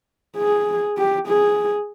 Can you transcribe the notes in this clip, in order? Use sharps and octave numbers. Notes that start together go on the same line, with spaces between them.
G#4
G4
G#4